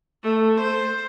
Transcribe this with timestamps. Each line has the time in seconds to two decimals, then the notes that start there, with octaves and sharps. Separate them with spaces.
0.23 A3
0.60 C5